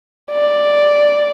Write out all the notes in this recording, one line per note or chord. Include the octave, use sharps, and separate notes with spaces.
D5